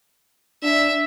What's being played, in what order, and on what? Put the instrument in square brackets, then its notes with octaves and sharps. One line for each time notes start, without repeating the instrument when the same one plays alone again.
[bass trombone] D4 [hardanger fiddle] E5